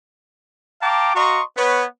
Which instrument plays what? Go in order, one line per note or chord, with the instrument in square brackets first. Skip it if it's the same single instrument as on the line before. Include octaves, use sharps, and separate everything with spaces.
[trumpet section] F5 G5 A5 A#5 D6
F#4 D#5 F5 A#5 C6 C#6
B3 B4 C#5